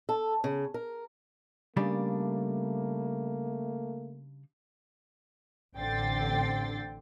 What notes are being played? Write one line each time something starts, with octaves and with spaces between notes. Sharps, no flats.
A4
C#3
A#4
C#3 G3 A3 A#3 D4
A1 D3 C4 G5 A6 C7